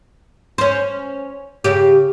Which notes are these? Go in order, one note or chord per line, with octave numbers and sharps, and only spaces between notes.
C#4 C5
C#3 G4